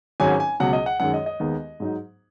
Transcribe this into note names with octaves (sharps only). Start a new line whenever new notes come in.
G#1 G#2 F#3 C#4 G#5
G#5
C#2 B2 F#3 F#5
D#5
F#5
F#2 D#3 G#3 F#5
D#5
D#5
D#2 D#3 G#3 B3 D#4
G#2 F#3 D#4